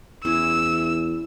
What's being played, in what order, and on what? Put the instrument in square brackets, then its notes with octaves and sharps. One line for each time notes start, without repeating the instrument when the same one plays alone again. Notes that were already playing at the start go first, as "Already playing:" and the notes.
[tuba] E2 [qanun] E3 C#4 E4 [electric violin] E6